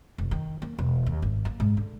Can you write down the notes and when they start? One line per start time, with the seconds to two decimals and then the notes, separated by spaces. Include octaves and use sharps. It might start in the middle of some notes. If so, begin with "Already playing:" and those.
0.18 F1
0.31 D#3
0.62 A#3
0.79 E1
1.06 D#2
1.22 G#1
1.45 A#3
1.60 G#2
1.77 D3